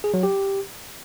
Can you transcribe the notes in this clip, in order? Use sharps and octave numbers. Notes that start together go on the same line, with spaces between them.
G#4
F#3
G4